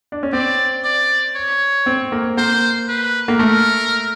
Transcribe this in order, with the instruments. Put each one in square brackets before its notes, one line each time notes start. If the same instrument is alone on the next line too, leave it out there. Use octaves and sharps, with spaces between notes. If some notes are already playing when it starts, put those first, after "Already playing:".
[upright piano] D4
C#4
[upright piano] C4 [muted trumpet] D5
[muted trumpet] D5
C#5
[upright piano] C4
A#3
[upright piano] A#3 [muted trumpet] C5
[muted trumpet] B4
[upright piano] A#3
[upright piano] A3 [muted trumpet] A#4